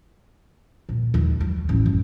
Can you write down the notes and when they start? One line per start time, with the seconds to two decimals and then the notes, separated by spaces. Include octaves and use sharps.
0.89 A#2
1.14 D#2
1.41 F#3
1.69 A1
1.86 F#1